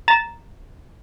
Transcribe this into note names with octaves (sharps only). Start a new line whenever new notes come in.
A#5 A6 E7